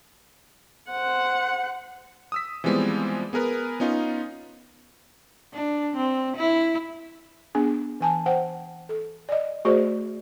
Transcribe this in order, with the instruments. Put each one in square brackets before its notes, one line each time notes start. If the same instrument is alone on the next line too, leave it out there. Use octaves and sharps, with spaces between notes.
[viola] C5 F#5
[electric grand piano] D#6 E6 B6
E3 F3 G3 G#3 B3 C4
B3 G#4 A#4 B4
B3 C#4 D#4 F4
[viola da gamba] D4
C4
E4
[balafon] B3 D4 G#4
E3 G#5 A5
C5 F#5 G5
A4
D5 D#5
A3 F#4 G#4 C5 D5